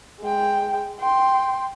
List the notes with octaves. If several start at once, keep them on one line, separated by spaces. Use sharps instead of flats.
G#3 G5
G5 C6